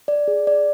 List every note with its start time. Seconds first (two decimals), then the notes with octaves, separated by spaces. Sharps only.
0.08 D5
0.28 G#4
0.47 D5